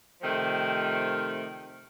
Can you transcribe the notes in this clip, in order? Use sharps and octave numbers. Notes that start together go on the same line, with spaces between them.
C3 D#3 F3 A3